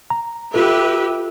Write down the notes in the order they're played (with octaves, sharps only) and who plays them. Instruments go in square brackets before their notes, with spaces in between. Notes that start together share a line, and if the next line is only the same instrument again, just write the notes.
[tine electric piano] A#5
[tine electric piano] F4 A4 [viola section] G4 B4 E5